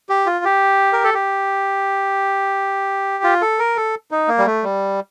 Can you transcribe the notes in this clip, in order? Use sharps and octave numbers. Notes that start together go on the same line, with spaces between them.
G4
F4
G4
A#4
A4
G4
F4
A4
A#4
A4
D#4
A#3
G3
A3
G3